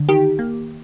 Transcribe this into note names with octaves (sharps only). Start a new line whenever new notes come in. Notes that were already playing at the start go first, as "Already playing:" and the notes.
Already playing: D3
D#3 G4
A#3